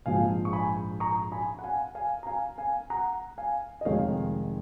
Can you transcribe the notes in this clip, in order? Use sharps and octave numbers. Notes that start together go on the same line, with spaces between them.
A#1 G#2 F3 F5 G#5
C#6
G#5 B5
A#5 C#6
G#5 B5
F#5
F5 G#5
F5 G#5
A#5
F5 G#5
F5 G#5
F#5 A#5
F5 G#5
D#5
F1 F2 D#3 G#3 C#5 F5